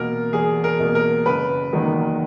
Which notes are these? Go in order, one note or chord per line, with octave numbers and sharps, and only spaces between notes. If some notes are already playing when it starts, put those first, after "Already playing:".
Already playing: E2 B2 A#3 A#4
E2 G#4
A#4
B2 A#3
A#4
F#1 B4
E2 D#3 F#3 A#3